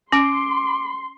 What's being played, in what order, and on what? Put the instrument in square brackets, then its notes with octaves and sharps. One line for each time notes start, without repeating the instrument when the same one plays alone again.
[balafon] C#4 [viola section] C6 [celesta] D6 D7